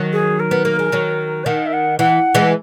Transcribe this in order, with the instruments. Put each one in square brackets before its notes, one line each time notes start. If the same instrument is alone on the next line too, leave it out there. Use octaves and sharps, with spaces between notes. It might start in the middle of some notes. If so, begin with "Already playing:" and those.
Already playing: [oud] D#3 F#3
[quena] G#4
A#4
[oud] B3
A#3
G#3
D#3 F#3
[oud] D#3 [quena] F#5
[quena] E5
F#5
[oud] E3 [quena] F#5
[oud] E3 G#3